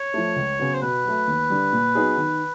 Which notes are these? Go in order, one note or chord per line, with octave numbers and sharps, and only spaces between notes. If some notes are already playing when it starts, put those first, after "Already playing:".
Already playing: C#5
F3 A3
C#2
C#3 F#3 B3
C5
B2 B4
F#3 A3
D#2
D3 G3
A#2
F#3 B3 D#4 G#4
D#3